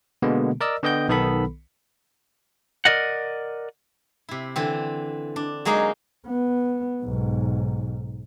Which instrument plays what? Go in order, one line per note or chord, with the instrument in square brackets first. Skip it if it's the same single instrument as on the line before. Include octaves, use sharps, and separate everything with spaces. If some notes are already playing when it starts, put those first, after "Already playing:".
[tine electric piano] B2 D3 G#3 A#3 B3
A#4 D5 D#5 E6
D3 B3 D#5 G5 G6
B1 D#3 B3 A4 B5
[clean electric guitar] A#4 D5 D#5 F#5
[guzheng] C3 E4
D3 E3 C4
D4
F#3 G#3 A#3 D#4 G#4
[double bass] B3
B1 G#2